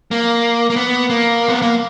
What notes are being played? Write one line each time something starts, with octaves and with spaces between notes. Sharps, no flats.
A#3
A#3
B3
A#3
B3
A#3